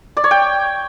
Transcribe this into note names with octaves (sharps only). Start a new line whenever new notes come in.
D5
C#5
G5